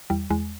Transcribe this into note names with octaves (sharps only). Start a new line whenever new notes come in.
E2 G3
E2 G#3